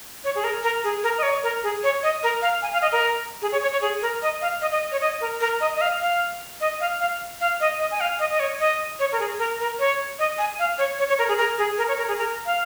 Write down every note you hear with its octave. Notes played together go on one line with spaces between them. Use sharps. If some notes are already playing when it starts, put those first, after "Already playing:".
C#5
G#4
A#4
A#4
G#4
A#4
D#5
C#5
A#4
G#4
C#5
D#5
A#4
F5
G#5
F5
D#5
A#4
G#4
C#5
C#5
C#5
G#4
A#4
D#5
F5
D#5
D#5
C#5
D#5
A#4
A#4
D#5
D#5
F5
F5
D#5
F5
F5
F5
D#5
D#5
G#5
F5
D#5
D#5
C#5
D#5
C#5
A#4
G#4
A#4
A#4
C#5
D#5
G#5
F5
C#5
C#5
C#5
A#4
G#4
A#4
G#4
A#4
C#5
A#4
G#4
A#4
F5